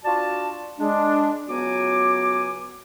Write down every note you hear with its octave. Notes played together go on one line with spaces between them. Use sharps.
D4 F4 F#4 D5 A5
G#3 D4
C#2 F#3 B3 F#4 G#5 D6